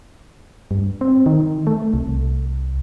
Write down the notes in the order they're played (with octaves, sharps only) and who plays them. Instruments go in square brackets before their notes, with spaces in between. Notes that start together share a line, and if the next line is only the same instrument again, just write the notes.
[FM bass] G2
C4
D#3
A3
C2